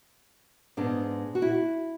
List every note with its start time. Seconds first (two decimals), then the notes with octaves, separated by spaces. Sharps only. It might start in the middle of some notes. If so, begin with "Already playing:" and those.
0.77 G#2 G#3 B3 D4
1.35 F#4
1.42 E4